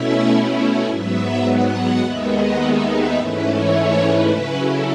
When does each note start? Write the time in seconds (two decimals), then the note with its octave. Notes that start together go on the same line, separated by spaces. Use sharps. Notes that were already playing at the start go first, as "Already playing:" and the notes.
Already playing: B2 A3 C#4 E4 E5
0.85 G#2 F#3 B3 E5
1.43 F#5
2.01 D#2 D#3 G#3 B3 D#4 E5
2.29 F#5
2.58 E5
2.87 E5
3.15 G#2 E3 A3 C#4 E4 B4
3.45 C#5
4.01 B4
4.31 C#3 F#3 C#4 E4
4.59 A4